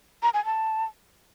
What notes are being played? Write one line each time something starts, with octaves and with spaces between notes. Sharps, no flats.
A#5
G#5
A5